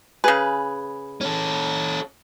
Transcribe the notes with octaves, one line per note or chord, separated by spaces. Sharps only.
C#3 G#4 B4
C#4 A4